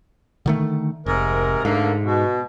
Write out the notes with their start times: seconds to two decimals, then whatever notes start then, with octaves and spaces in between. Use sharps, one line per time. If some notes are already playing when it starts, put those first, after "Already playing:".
0.46 D3 D#3 A3
1.06 F1 G#2 C3 A#4
1.65 G#2 D3 A3 A#3
2.03 B2